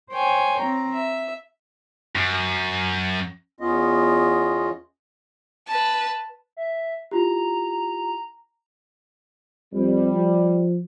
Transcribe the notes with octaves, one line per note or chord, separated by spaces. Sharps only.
C5 C#5 G5 G#5
C4 A#5
E5
F#2
E2 B3 C#4 F4 D#5
B4 A5
E5
E4 F4 G4 A#5
F2 G3
F3